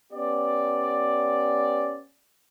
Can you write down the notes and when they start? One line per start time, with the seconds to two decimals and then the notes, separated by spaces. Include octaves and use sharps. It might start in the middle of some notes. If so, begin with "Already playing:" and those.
0.13 B3 C#4 G4 D5